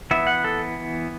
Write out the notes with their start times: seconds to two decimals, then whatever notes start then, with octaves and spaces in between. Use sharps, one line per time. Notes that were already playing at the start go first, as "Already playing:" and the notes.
0.11 E3 B3 E5
0.27 F#5
0.44 A4